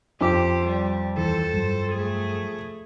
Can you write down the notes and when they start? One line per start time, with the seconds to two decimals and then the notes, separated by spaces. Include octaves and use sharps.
0.21 F2 G4 C5 D6
0.66 G3
1.17 D#2 E3 A4 C5
1.54 G2 F#3
1.92 A3 G#4